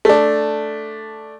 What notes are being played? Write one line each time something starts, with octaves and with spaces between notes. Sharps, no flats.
A3 D4